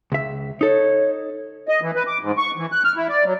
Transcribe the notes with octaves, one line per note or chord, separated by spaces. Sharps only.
C#2 E5
D#4 A4 C#5
D#5
E3
B4
D6
G#2
C#6
E3
F#6
F6
E4
D5
F#3